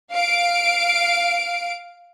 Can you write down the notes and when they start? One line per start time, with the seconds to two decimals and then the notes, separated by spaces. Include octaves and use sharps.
0.13 F5 D7